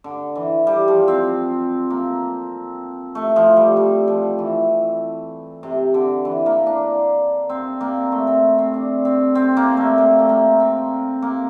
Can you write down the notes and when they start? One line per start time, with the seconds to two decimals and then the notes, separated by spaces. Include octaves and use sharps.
0.04 D3
0.35 E3
0.67 G3
0.88 F3
1.08 C4
1.90 A#3
3.15 A3
3.36 F3
3.56 G3
3.77 G3
4.08 F3
4.39 E3
5.63 C3
5.94 D3
6.25 E3
6.46 A#3
6.66 D4
7.49 C4
7.81 A#3
8.12 A3
8.27 C4
8.58 C4
8.74 D4
9.05 C4
9.35 C4
9.57 A#3
9.77 A3
9.98 A#3
10.19 A3
10.29 A#3
10.60 C4
11.22 A#3